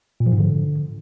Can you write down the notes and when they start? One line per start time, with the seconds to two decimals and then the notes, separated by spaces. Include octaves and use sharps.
0.20 A#2
0.26 F3
0.32 G#2
0.38 D3